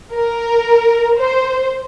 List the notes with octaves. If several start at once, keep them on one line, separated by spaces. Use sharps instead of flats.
A#4
C5